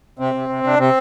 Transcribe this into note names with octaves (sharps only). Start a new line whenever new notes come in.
C3 C4
C3
C3
C3 D4
C3 C4